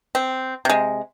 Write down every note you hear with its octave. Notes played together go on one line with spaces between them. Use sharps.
C4
C3 G#3